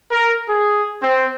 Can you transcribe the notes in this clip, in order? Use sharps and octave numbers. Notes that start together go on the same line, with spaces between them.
A#4
G#4
C4